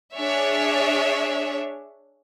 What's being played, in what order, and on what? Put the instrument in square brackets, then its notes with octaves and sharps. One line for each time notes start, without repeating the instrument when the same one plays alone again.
[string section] D4 G#4 C#5 E5